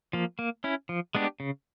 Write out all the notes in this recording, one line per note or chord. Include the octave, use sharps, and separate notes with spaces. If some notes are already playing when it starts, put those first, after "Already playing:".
F3 A#3
A#3
C#4 E4
F3
G#3 B3 D4 G4
C#3